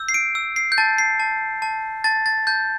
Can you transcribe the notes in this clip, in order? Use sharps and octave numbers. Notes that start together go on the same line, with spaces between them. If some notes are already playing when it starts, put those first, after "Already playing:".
Already playing: E6 G6
C7
D7
E6
C7
G6
A5 A6
C7
A5
A5
A5 A6
A6
A5 G6